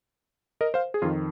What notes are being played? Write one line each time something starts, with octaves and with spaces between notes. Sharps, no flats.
A#4 D#5
C5 F5
G#4
F2 D#3 F4